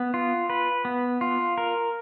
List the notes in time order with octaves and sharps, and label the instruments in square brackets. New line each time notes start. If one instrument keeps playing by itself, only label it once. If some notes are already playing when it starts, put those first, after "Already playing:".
Already playing: [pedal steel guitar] B3
F4
B4
B3
F4
A#4